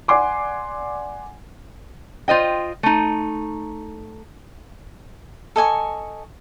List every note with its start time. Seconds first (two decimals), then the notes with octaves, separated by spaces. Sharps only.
0.08 D5 F#5 G#5 C6 D6
2.28 F4 C5 D#5 G5
2.83 A3 D#4
5.56 A4 D#5 G#5 C#6